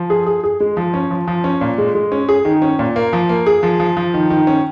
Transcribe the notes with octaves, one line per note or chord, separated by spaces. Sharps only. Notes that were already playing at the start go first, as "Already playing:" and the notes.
Already playing: F3
G#4
G#4
G#4
G#3
F3
C#4
F3
F3
C#4
A#2
G#3
G#3
C#4
G#4
D#3
C#4
A#2
A#3
F3
A#3
G#4
F3
F3
F3
D#3
D#3
C#4